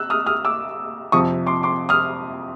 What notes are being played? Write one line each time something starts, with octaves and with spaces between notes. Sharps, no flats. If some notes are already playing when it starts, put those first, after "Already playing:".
Already playing: E6 F#6
D#6 F6
D#6 F6
D6 E6
F2 C3 F3 C#6 D#6
C6 D6
C6 D6
D#6 F6